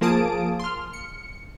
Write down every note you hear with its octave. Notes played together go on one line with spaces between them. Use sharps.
F3 A#3 G#4 A5 D#6 D7
C6 F6
C#7